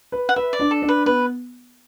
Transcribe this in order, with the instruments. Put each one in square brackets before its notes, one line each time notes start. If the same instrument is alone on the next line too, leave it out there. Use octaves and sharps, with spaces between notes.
[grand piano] B4
[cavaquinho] F#5
[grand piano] B4 [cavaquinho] E5
[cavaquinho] D5
[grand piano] D4
[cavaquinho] A4
[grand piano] D4
[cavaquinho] B4
[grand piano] B3 [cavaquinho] B4